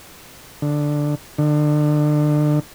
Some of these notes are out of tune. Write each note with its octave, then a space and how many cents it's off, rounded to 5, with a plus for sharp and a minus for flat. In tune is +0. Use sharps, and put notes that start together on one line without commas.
D3 +5
D3 +30